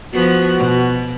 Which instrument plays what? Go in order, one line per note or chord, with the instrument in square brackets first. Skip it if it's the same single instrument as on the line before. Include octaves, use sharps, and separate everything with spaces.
[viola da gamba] F3 B3 [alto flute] F#4
[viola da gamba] B2